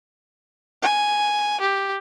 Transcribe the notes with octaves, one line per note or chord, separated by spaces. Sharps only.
G#5
G4